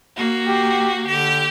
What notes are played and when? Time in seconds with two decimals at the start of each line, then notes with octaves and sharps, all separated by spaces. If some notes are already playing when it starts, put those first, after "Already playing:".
0.16 A#3 F#4
0.47 G4
1.06 D3 G4